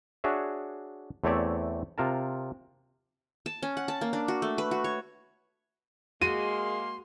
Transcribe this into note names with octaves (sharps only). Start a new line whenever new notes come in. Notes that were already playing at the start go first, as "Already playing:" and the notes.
D4 F#4 G#4 C#5 E5
E2 A3 C4 C#5 D5 E5
C3 F4 A#4 A5
A5
C#4
F#5
A5
A#3
D4
F#4
A3
B4
F#4
C#5
G#3 A#3 F#4 C6 D#7